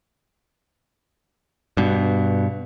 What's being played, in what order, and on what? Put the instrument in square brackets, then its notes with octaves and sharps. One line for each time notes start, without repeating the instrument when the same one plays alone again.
[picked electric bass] G2 B2